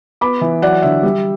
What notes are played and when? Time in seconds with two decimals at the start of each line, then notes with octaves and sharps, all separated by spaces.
0.21 B3 B5 D6
0.41 E3
0.62 F#3 D5 F#5
0.82 D3 E5
1.03 G3